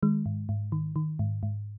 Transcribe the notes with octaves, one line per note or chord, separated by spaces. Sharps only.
D#3 G#3
G#2
G#2
D#3
D#3
G#2
G#2